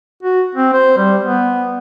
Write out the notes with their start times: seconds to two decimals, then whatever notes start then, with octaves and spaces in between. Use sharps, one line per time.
0.23 F#4
0.55 C4
0.73 C5
0.97 G3
1.24 B3